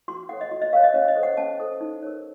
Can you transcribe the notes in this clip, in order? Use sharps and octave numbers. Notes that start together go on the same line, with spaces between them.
F#4 C6
A4 C#5 F#5
D#5
F#4
D#5
A#4 C#5 F5
D#5
C#4 C#5
D#5
A4 C5
F#5
C#4 A5
A4 C5
D#4
A#4 C#5